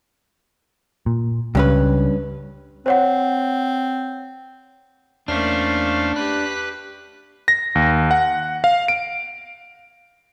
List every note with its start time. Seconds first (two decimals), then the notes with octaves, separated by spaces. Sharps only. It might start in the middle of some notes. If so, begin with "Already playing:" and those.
1.06 A#2
1.55 C#2 G2 C#4 B4
2.86 C4 C5 C#5 F#5
5.28 E2 A3 A#3 C#4 D4 C5 F5 F6
6.16 G4 B4 B5 F#6
7.48 A#6
7.75 D#2
8.11 F#5
8.64 F5
8.88 D7